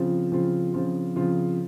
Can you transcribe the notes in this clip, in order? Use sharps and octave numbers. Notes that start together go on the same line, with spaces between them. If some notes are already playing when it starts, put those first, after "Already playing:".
Already playing: C#3 F3 C4 F4
C#3 F3 C4 F4
C#3 F3 C4 F4
C#3 F3 C4 F4